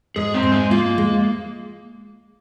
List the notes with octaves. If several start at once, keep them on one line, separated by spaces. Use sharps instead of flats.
G#2 G#4
C4
G#2
G#3
A#3 F4
G#3